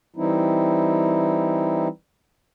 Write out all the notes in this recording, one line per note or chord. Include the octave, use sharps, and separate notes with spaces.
E3 G3 C4 D#4 E4